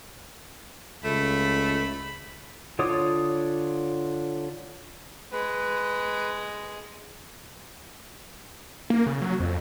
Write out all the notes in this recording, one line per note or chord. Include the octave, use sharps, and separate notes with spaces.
C#2 A3 B5
D3 F4 C#5 D6 D#6
G#3 B4
A#3
C#3
F#3
F2